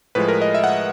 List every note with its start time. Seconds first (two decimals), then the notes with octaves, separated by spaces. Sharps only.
0.15 A2 F3 G#3 B4
0.28 A#4
0.42 D#5
0.55 E5
0.64 F#5